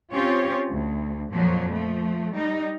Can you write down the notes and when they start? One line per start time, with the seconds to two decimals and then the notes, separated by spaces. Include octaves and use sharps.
0.13 C4 C#4 F4 G4 C#5
0.72 D2
1.31 F2 A#2 F3 F#3
1.72 F3 A3
2.34 G3 D#4